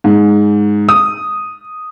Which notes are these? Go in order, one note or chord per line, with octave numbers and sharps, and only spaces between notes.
G#2
D#6